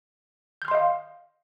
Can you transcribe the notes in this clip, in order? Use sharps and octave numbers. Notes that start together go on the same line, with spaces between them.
D#5 F5 C6 F6 G6